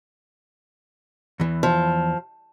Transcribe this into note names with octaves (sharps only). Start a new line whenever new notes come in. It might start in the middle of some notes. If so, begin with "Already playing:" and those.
E2 E3
F3